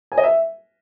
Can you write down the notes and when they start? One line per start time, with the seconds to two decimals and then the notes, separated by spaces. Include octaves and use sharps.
0.12 G#5
0.18 D#5
0.24 E5